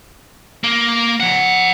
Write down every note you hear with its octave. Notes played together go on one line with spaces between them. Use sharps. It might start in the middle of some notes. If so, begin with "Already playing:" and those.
A#3
F3 F#5